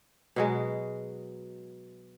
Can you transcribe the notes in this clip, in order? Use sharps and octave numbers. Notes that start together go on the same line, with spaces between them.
B2 F#3 G#3